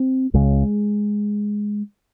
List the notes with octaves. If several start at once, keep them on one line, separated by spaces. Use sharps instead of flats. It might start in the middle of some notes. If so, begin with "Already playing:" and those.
Already playing: C4
C#2 C#3 G#3